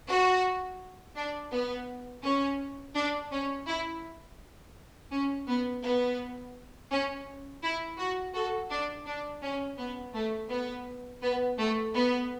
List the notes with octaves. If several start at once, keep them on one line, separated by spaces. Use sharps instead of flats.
F#4
D4
B3
C#4
D4
C#4
E4
C#4
B3
B3
C#4
E4
F#4
F#4 A4
D4
D4
C#4
B3
A3
B3
B3
A3
B3